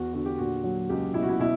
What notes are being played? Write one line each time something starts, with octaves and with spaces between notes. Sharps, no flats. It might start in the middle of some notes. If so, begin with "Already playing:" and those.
Already playing: E2 F#4
D3 F#4
G4
A#2 F#4
F#3
C#2 G4
B2 E4
F#4
E4
B2 E4